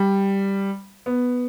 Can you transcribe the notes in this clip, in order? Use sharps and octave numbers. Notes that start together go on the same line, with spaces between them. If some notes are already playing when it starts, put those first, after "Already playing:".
Already playing: G3
B3